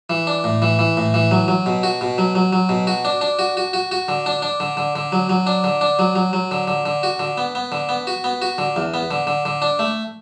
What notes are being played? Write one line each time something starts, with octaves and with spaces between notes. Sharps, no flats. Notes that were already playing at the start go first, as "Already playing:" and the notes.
E3
D4
A2
E3
E3
A2
E3
F#3
F#3
B2
F#4
B2
F#3
F#3
F#3
B2
F#4
D4
D4
F#4
F#4
F#4
F#4
D3
D4
D4
D3
D3
D3
F#3
F#3
D4
D3
D4
F#3
F#3
F#3
D3
D3
D3
F#4
D3
B3
B3
D3
B3
F#4
B3
F#4
D3
E2
B3
D3
D3
D3
D4
A3